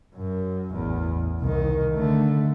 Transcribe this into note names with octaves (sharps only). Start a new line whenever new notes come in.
F#2
A1 E2
C2 D#3
D3 A3